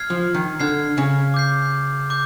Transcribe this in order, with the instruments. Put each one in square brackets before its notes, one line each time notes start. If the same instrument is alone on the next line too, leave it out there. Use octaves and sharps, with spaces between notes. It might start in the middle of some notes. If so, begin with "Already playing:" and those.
Already playing: [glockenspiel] F6 G#6 C7
[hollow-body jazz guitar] F3
D#3
[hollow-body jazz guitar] D3 [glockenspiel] F6 G#6 C7
[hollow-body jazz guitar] C#3
[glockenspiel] D6 G6 C7
D6 G6